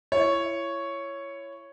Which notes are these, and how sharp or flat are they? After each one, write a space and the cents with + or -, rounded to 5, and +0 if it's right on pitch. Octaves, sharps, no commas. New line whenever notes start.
E4 +30 C#5 +0